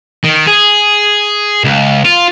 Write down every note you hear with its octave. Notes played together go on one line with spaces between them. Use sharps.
D#3
G#4
C#2
F4